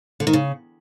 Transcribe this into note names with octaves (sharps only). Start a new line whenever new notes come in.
D3
D#3
C#3